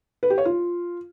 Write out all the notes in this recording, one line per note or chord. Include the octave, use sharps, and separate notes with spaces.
B4
G4
C#5
F4